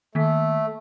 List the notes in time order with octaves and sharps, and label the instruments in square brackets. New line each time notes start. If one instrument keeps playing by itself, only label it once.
[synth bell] D#3 A#3 B6 [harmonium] A3